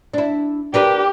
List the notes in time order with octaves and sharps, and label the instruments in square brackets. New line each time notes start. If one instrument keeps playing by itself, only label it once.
[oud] D4 E4
[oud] D4 A#4 B4 [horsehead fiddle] G4